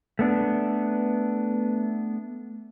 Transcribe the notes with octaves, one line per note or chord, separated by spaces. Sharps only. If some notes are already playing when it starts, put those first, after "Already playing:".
A3 B3 D4